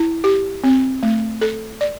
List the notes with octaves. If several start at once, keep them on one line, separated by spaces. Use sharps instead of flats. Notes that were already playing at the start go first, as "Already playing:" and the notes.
Already playing: E4
G4
C4
A3
A4
D5